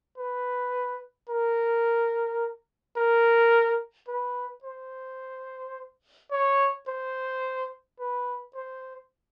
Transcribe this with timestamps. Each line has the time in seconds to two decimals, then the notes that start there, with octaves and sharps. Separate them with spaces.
0.18 B4
1.29 A#4
2.97 A#4
4.08 B4
4.64 C5
6.31 C#5
6.88 C5
7.99 B4
8.55 C5